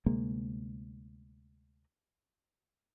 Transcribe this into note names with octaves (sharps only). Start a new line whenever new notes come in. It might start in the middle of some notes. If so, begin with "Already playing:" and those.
D2 C3 G#3 A#3